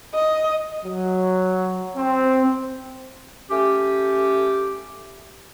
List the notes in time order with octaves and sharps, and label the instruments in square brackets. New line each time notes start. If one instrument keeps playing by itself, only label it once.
[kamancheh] D#5
[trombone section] F#3
C4
[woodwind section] A3 C#4 G4